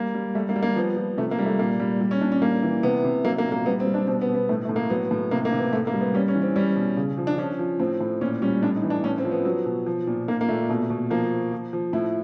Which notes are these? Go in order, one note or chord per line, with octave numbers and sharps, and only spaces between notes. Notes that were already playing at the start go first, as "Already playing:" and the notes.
Already playing: G3 A#3
G3
G3 A3
A#3
G3
A#3
F3 B3
F3
C3 A3
A#3
G3
A3
A#2 A#3
G3
G3
C#4
A#2 D4
C#4
G3 A#3
E3
C3 B3
C3
F#3 A#3
A#3
A#2
A#3
G3 B3
C4
G3
D4
B2 C4
B3
B2
B3
A2 A3
A2 A3
A#3
F#3 B3
A2
C3 A#3
A#3
C3
B3
A2 A3
A#3
G3
B3
G3 C#4
C#4
E3
C4
G3 C#4
B2
C#3
F3
D4
F3 C#4
F3
A2 C4
A2
A#2 C#4
G3 C#4
A2 D4
D#4
E3
D4
A2 C#4
C4
F3
B3
F#3
B2
F3
A#2
A#2 A#3
A#3
A#2 A3
B2 A3
B2
F3 A#3
F3
F3
F3
A2 E4